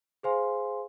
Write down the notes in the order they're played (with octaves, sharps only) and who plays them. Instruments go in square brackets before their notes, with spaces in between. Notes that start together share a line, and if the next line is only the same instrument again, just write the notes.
[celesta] G#4 C5 F5 G#5 C6